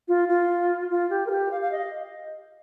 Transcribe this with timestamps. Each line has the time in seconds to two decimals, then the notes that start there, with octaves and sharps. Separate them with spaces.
0.08 F4
0.29 F4
0.90 F4
1.10 G4
1.26 A#4
1.30 G4
1.51 F5
1.61 F5
1.71 D#5